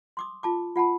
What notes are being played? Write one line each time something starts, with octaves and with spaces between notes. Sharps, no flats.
C6 D6 D#6
F4 A5 D6
F4 F#5 A5 B5